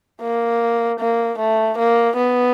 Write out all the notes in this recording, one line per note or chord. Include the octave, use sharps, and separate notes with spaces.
A#3
A#3
A3
A#3
B3